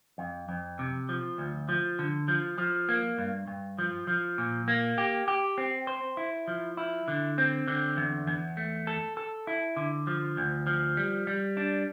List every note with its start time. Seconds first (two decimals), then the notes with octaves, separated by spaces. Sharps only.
0.18 F2
0.49 F2
0.79 C3
1.09 F3
1.38 D2
1.69 F3
1.99 D3
2.28 F3
2.58 F3
2.89 A#3
3.18 G2
3.47 G2
3.79 F3
4.07 F3
4.38 A#2
4.68 A#3
4.98 G4
5.28 G4
5.58 C4
5.87 C5
6.17 E4
6.48 F3
6.77 E4
7.08 D3
7.38 C4
7.68 D3
7.97 E2
8.27 E2
8.57 A3
8.87 A4
9.17 A4
9.47 E4
9.77 D3
10.07 F3
10.37 D2
10.67 F3
10.97 G3
11.27 G3
11.57 D4